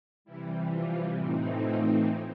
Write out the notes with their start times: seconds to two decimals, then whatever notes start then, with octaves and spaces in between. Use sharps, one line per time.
0.25 C3 E3 G3 E4
0.70 F3 F4
1.16 A2 E3 A3 C4 D#4
1.62 F3 F4